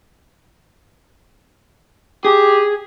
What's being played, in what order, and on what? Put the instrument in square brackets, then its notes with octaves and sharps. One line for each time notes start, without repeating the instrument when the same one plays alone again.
[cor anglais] G4 [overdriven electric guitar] G#4